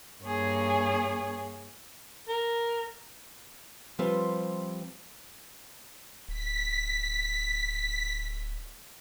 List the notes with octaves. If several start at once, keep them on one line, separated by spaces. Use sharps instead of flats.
G2 A#3 G#4 C#5
A#4
F3 G3 C4 G4 B4 C5
D1 B6